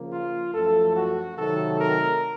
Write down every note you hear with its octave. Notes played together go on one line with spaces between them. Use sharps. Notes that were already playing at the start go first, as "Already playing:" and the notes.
Already playing: C#3 F3 A#3
F4
F#2 F3 A3 A4
F#4
C3 D#3 F#3 A3 C4 A4
A#4